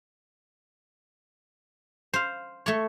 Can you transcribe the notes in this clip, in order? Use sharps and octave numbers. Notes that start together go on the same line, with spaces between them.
C5 F5
A3 C#5